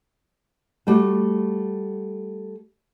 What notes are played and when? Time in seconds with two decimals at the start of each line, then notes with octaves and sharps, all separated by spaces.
0.87 G3 A3 F#4